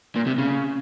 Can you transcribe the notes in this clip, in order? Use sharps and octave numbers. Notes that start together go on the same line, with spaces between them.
A#2
C3
C#3